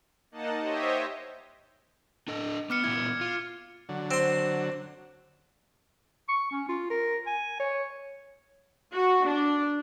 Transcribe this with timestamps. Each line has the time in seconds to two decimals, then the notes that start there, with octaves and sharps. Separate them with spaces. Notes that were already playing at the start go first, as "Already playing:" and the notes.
0.32 A#3 D#4 D#5 F#5 A5
0.60 G4 C5 C#5 D#5 E5
2.28 D4 A4 D#5
2.70 B3 D6 F6 C#7
2.84 A#2 B3 E4 G#6
3.21 F4
3.89 D3 F#3
4.11 C4 C6
6.28 C#6
6.51 C#4
6.69 F4
6.90 A#4
7.26 G#5
7.60 C#5
8.94 F#4
9.26 D4